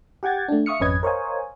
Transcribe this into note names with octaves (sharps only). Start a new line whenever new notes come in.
G4 F#5 G5 G#6 A6
A3 D4
E5 F5 C#6 D#6 F6 C#7
G#1 F2 C#4 B4 D#5 G#6
A#4 C5 C#5 D#5 F5 G#5